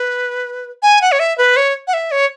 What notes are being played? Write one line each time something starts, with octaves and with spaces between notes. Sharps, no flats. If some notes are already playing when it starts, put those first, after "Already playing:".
Already playing: B4
G#5
F#5
C#5
E5
B4
C#5
F#5
E5
C#5